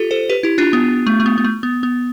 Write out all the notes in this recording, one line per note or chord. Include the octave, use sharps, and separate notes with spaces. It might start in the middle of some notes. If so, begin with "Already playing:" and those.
Already playing: F4 G4 A4
A4 C5
G4 B4
E4 G4
D4 F4
B3
A3
A3
B3
B3
A3
B3
B3